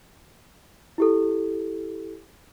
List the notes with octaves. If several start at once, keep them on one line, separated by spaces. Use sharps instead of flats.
E4 G4 A4